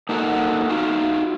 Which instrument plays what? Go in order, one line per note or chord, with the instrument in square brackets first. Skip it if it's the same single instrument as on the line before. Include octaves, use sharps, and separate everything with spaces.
[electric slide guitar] A#3 D#4 F#4 A4 C#5 F#5
D#4 F4 F#4